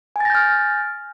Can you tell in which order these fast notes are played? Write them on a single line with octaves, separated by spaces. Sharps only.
G#5 A6 A#6 G6 F6